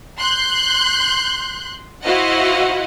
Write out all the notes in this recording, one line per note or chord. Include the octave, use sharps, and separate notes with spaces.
C6 F#6 G6
E4 F#4 C5 D#5 F5 F#5